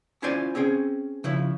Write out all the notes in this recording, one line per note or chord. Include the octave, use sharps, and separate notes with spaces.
C#4 E4 F4 C5 D5 G#5
C4 C#4 G#4 C5 G5
C#3 F3 E4